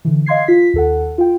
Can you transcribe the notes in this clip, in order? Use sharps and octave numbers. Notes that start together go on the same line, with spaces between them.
D3 E3
D#5 F5 C6 G#6 C7
F4 B6
D#2 A4 F#5
F4 G5